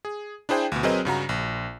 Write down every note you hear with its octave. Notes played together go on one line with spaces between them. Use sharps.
G#4
D4 E4 G#4 C5 G5
D2 B2
F#3 C4 G#4 A#4 B4 D#5
G2 C#3 F#4 A#5
A#1